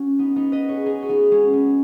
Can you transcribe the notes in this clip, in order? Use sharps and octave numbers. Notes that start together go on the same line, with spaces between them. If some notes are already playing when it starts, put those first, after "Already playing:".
Already playing: C#4 F#4
B3 D#4
B3 D#4
B4 D#5
G#4 C#5
D#4 G#4
F#4
B3 D#4
G#3 C#4
B3